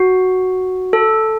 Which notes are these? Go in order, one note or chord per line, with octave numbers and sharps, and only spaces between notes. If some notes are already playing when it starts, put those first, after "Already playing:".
Already playing: F#4
A4